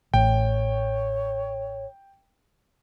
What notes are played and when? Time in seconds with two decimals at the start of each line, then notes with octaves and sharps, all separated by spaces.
0.14 A1 C#5 G5